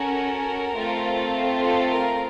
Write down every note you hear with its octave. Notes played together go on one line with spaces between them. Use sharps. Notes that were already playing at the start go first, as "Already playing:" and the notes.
Already playing: C#4 F#4 A4 A#4
A3 C4 F4 A4
A4
A#4